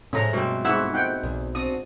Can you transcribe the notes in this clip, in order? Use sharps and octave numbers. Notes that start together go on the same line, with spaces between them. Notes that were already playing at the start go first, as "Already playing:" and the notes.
A2 F3 G#3 A3 C#4 A#5
G2 B2 C4
G#2 E4 F#4 F#5 E6
D#4 F#5 G5
B1 E2
C4 D4 F#4 D#6